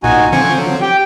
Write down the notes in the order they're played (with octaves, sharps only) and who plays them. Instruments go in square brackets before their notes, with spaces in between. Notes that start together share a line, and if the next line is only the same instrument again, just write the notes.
[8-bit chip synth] A#1 A#2 [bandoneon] D#4 F#4 G#5
[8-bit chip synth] D3 F3 C4 [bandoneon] G#5 C#6
[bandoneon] F#3
G4 G5